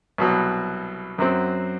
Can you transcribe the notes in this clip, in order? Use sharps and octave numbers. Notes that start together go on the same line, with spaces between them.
C2 B2 F#3
F#2 F#3 C4